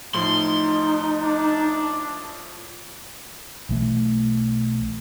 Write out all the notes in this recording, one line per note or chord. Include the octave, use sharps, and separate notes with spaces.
A2 F3 D#4 C6
D4
B1 E3 A3